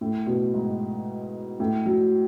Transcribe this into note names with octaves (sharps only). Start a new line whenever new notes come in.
A2
B2
G#2
A2
F#3